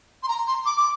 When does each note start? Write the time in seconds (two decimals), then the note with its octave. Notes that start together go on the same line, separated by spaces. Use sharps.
0.23 C6
0.28 A#5
0.47 C6
0.65 D6
0.77 D6